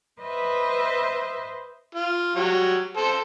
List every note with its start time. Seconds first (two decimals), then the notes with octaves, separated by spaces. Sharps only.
0.20 B4 C5 D#5 E5
1.95 F4
2.36 F#3 G3 C#5
2.97 A4 C5